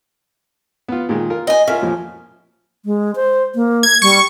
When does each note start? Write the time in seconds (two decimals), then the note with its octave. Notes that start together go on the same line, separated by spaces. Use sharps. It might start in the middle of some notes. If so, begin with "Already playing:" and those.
0.88 B3 F4
1.09 A#2 D#3 G#3
1.30 F4 A#4
1.47 D#5 G#5
1.68 C#4 F4 A#4 E5
1.82 F2 A#2 F3
2.85 G#3
3.15 C5
3.55 A#3
3.83 G#6
4.02 G3 C#6